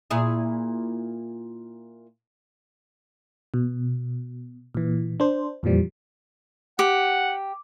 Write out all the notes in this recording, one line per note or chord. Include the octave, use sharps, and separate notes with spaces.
A#2 E4 G#4
B2
A#2 E3
D4 C5
F2 A#2 E3 F3 G3
G4 F#5